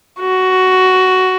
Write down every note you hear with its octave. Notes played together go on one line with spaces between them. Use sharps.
F#4